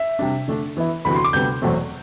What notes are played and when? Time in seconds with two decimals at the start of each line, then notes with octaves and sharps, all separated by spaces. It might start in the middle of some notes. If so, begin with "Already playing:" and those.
Already playing: E5
0.19 C3 G3 D4
0.48 D3 A3 D4
0.77 E3 B3 E4
1.05 D2 C3 E3 B3 F#4 B5
1.14 C6
1.24 D6
1.33 D2 C3 G3 B3 G6
1.62 E2 B2 F#3 A3 C4